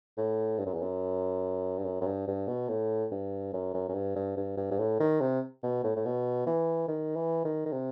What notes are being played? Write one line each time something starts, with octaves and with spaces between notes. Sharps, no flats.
A2
G2
F#2
E2
F#2
G2
F#2
F#2
G2
G2
B2
A2
G2
F#2
F#2
F#2
G2
G2
G2
G2
G2
A2
D#3
C3
B2
A2
A2
B2
E3
D#3
E3
D#3
D#3
C3